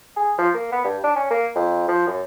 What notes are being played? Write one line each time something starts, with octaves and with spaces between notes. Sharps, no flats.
G#4
F3
A#3
B3
G2
D4
C#4
A#3
F2
F3
F#2